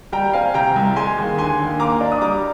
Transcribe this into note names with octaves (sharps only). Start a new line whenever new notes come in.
G3 G5 A#5
C4 F5 G#5
C3 G5 A#5
C2
G#3 G#5 C6
D#2
D3 G#5 C6
D#2
A#3 A#5 D6
D4
D#6
G3 A#5 D6